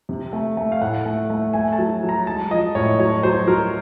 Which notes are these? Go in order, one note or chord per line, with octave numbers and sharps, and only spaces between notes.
C3
A3
A3
F5
A2 F#5
A3
A3
A3 G#5
A5
F#3
F#3
A#5
G#3 A5
F3 D#5
A2 C#5
F#3 C#5
F#3 C5
F#3 A#4